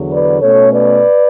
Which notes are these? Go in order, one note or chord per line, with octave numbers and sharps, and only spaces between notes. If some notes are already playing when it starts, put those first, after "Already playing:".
Already playing: E2 D3 F#3
B4 D5
B2 A3 C#4 A4 C#5
B4 D5